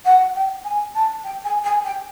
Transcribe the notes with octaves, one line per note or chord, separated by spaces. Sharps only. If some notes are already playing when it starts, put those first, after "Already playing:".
F#5
G5
G#5
A5
G5
G#5
G#5
G5